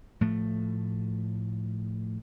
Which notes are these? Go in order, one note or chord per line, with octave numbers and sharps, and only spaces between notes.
A2 F3 A3